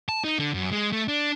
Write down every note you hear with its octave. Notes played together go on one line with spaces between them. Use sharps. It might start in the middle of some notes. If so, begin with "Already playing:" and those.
A5
D#4
D3
F#2
G#3
A3
D4